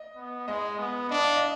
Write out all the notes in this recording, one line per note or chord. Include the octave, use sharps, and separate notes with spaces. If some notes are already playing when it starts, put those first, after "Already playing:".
Already playing: D#5
B3
G#3 D#5
B3
D4 D#5
F5
D#5